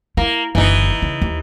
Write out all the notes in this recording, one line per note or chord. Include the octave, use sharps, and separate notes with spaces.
A#3 E4
F#1 D3 E3 D#4
C#3
D#2